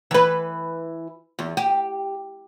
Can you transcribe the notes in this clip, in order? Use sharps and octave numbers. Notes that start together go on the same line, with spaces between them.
E3 B4
E2
G4